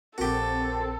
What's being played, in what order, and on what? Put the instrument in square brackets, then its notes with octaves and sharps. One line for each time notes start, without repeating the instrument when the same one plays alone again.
[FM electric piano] A#1 A#4 [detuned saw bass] C4 [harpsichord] F#4 G4 [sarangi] A4